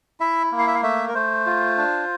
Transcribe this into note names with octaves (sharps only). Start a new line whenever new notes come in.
E4 E5
A#3
F5
E5
F5
A3 E5
A#4
A3 C5
F4
D4